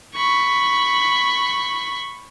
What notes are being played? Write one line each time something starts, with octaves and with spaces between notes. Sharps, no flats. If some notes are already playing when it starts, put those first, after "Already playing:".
B5 C#6